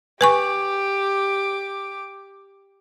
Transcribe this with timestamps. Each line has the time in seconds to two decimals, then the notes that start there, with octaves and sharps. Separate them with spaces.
0.21 G4 B4 G#5 C#6 D6